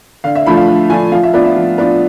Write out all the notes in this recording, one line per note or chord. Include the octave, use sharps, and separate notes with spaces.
D3 F5
E5
F3 A3 D4 F4 B5
F5
D3
F3 A3 D4 F4 G#5
F3 F5
E5
B3 D4 F4 D5
E5
F3
B3 D4 F4